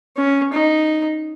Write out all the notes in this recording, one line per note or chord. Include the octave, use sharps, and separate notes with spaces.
C#4
D#4